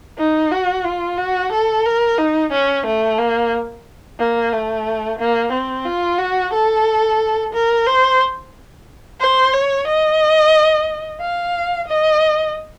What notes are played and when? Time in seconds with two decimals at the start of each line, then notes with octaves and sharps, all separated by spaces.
0.18 D#4
0.51 F#4
0.84 F4
1.18 F#4
1.52 A4
1.85 A#4
2.18 D#4
2.52 C#4
2.86 A3
3.18 A#3
4.19 A#3
4.53 A3
5.19 A#3
5.52 C4
5.85 F4
6.19 F#4
6.53 A4
7.53 A#4
7.86 C5
9.20 C5
9.53 C#5
9.87 D#5
11.20 F5
11.88 D#5